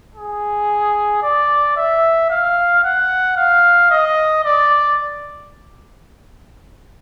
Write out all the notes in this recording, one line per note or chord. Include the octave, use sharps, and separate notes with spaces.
G#4
D5
E5
F5
F#5
F5
D#5
D5